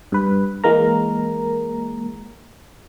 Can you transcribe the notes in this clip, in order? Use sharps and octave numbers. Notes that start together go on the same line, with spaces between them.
G2 B4
E3 G#3 A#3 A#4 A#5